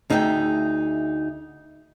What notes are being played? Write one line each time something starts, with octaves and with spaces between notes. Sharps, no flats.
D2 D#4 G#4 E5 F5 G5